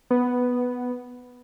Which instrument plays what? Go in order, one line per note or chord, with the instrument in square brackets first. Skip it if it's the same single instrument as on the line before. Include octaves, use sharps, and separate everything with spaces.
[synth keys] B3